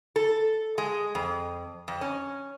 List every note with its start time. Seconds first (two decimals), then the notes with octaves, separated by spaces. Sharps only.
0.16 A4
0.78 G#3
1.15 F2
1.88 F2
2.01 C#4